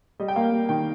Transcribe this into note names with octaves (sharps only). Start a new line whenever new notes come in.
G3 D#5
G5
A#3 F5
G3
D#3 G5